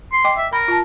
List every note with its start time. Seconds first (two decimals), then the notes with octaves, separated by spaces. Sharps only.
0.12 C6
0.25 D#5 G5 D6
0.37 E5
0.53 A#4 B5
0.68 F4 A5